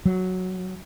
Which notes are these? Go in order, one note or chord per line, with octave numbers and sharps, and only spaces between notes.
F#3